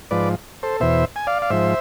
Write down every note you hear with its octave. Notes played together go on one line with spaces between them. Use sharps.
G#2 F3 B4 D5
A4 C5
E2 B2 C5 E5
G#5
D5 F5
F5
G#2 F3 C5 E5